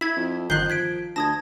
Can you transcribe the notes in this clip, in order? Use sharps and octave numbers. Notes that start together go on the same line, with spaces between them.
E4 G#6 B6
F2
G1 D#3 F3 F#6 G6 C7 G7
G#6 B6 D7
D2 A5 D#6 G#6 A#6